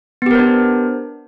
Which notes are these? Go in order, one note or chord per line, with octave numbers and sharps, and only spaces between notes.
B3 D4 G4 A#4 C5